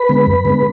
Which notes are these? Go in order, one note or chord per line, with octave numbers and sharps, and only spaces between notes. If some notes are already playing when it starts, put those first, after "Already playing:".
Already playing: B4 B5
D3 G#3 B3
F#2
D3 G#3 B3